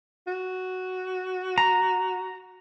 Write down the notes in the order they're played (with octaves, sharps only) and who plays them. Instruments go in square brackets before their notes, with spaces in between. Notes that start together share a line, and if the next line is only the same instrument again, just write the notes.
[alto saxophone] F#4
[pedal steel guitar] A#5